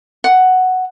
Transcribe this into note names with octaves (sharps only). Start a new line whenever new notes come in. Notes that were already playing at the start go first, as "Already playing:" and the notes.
F#5